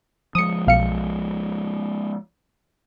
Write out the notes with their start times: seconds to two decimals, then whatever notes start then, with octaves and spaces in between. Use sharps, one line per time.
0.35 F3 G#3 D#6 C#7
0.67 B1 F5 C#7